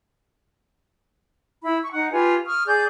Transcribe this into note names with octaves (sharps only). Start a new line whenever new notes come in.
E4 B5
C#6
D#4 F#5
F4 G4 B4 G#5
C#6 D#6 F6
G#4 D5 D6 G6